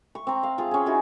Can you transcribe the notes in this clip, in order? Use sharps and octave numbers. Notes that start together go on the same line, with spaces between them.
C#6
C4 A#5
F5
F4 G#4
C#4 G#4
C#4 D#4 E4 F#4